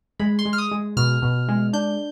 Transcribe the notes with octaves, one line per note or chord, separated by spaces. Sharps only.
G#3 B5
C6
G#3
F6
D#6
G#3
B2 F6
B2
G#3
D4 G6